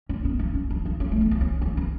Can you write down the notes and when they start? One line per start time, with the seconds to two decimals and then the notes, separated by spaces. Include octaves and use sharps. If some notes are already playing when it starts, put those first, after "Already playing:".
0.09 C#4
0.25 B3
0.39 C#4
0.55 C#4
0.71 D4
0.85 C#4
1.00 C#4
1.12 A3
1.21 B3
1.31 B3
1.41 C#4
1.62 C#4
1.77 B3